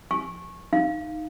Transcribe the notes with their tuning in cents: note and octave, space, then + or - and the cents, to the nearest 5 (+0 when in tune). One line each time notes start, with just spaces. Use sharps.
G#5 +30 C#6 -20
D#4 +0 F5 +0